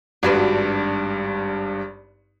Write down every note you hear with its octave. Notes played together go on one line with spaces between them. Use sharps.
G#1 G2 D4 F#4 B4